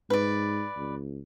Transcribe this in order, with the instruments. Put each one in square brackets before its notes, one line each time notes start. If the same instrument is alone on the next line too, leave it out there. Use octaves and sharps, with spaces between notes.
[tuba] G#2 [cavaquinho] B4 D5
[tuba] C#2